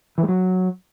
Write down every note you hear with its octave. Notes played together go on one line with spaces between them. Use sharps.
E3
G#3
F#3